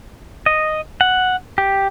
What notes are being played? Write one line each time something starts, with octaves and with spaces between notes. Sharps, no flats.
D#5
F#5
G4